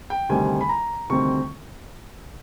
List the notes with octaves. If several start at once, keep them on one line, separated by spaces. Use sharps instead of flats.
G5
D2 C3 D#3 G3 C4 G#5
B5
A#5
D2 C3 D#3 G3 C4 C#6